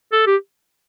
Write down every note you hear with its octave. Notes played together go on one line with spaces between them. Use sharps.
A4
G4